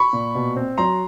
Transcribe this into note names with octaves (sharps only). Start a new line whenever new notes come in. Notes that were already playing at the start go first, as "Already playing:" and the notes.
Already playing: B5 C#6
A#2
B2
C4
F#3 A#5 C6